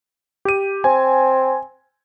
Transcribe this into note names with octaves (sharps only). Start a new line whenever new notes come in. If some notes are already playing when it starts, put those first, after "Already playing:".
G4 D#7
C4 G#5